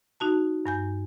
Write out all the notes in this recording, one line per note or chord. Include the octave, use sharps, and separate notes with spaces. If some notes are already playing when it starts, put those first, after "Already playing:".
D#4 F#4 A5
G2 G#5 G6